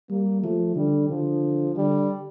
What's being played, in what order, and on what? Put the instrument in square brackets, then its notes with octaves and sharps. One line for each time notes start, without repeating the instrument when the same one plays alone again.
[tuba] G3 [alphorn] A#3
[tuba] F3 [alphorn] A3
[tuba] D3 [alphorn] G3
[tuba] D3 [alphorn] F3
[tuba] D3 [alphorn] G3